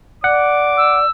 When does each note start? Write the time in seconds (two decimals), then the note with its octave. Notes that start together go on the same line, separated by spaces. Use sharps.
0.24 D5 F#5 D6
0.77 E6